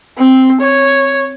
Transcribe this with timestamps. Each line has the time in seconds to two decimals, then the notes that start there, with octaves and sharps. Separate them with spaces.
0.18 C4
0.61 C#5